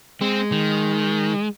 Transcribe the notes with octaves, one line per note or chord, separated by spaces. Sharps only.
G#3 C4
D#3